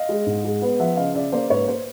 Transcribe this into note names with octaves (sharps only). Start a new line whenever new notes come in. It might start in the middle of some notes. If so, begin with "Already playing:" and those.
Already playing: D#5 F5
G#3
G#2
G#3
B3
F3 E5 F#5
C#3 D#5 F5
C#3 D5 E5
A#3 C5 D5
G#2 B4 C#5
C5